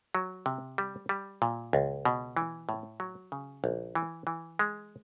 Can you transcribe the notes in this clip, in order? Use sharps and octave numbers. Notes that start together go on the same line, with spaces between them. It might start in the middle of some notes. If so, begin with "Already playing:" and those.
F#3
C3
G3
G3
A#2
C#2
B2
E3
A2
F#3
C#3
A#1
E3
E3
G#3